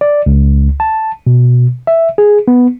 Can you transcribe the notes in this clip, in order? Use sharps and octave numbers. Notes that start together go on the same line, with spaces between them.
D5
C#2
A5
B2
E5
G#4
B3